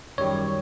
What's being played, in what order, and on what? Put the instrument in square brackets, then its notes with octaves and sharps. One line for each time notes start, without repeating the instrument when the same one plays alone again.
[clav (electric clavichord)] F#2 D#3 G3 [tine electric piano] C#5